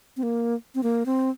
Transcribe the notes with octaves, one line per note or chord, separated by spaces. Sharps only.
C4
A#3
C4
A#3
C4